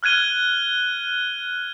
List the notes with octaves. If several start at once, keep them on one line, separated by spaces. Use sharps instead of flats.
F6 F#6 G#6 D#7 G7